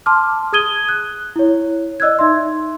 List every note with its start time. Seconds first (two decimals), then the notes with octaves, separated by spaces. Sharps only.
0.06 A5 C6 D6 F6
0.53 G#4 D#6 G#6 D#7 G7
0.89 F#6
1.36 E4 C#5
2.00 D5 D#5 E6 F#6 G#6
2.19 D#4 E5 C6